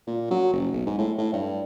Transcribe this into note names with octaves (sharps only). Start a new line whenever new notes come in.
A#2
F#3
F#1
B1
G#2
A2
A2
G2